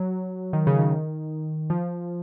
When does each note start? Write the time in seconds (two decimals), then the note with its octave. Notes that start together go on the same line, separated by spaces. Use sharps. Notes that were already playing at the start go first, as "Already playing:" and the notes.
Already playing: F#3
0.53 D#3
0.67 C#3
0.79 D#3
1.70 F3